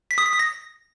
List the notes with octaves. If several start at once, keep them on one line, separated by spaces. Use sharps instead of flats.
B6
D#6
B6
D#6
A#6